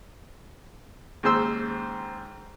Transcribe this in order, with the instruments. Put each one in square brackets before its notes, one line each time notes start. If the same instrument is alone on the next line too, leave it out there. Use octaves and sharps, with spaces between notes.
[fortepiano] D#2 G#2 C#3 C5 C6 E6